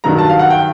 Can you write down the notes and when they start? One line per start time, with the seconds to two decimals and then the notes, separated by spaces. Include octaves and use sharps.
0.04 G2 D#3 F#3 A#5
0.18 A5
0.29 F5
0.39 F#5
0.50 G5